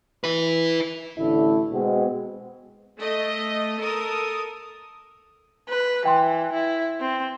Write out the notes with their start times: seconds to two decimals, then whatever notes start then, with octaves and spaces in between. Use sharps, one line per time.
0.24 E4 B4
1.16 A1 D3 A3 E4
1.71 B2 G#3 B3 C4
3.00 A3 D#5
3.80 A4 A#4 D#6
5.69 B4
6.05 E3 G5 C6
6.53 E4
7.00 C4